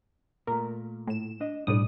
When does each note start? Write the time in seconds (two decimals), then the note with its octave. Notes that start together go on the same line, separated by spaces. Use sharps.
0.47 A#2 A3 A#4
1.07 A2 E7
1.40 D4 D#5
1.67 B1 A2 G3 D4 D5 D#6